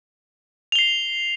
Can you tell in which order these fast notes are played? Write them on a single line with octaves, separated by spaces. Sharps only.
F7 G7 C7